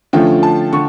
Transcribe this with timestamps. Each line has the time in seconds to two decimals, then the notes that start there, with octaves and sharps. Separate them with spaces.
0.13 D3 F3 A3 C#4 F4 G5
0.43 A5
0.73 D3 C#6